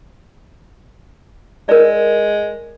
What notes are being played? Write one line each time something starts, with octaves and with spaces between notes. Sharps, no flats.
G#3 A#4 D5